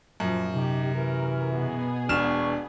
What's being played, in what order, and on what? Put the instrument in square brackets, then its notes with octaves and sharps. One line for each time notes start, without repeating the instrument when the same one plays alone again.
[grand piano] F#2 [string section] A#2 F3
[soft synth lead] C3 [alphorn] D#4 [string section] G4
[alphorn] E3 [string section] A#4
[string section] B2 B3 G#4
[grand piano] E1 F6 E7 [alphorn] D4 [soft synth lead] C#6